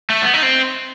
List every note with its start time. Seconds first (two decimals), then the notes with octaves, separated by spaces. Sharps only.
0.10 A3
0.22 B3
0.34 D#4
0.43 C4